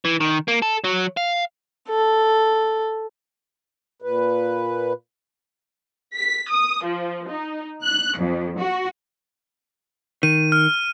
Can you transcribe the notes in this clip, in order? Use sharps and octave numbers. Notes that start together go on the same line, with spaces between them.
E3
D#3
A#3
A4
F#3
F5
A4
A#2 B4
B6
D#6
F3
D#4
F#6
F2
F#4
D#3 D#7
F6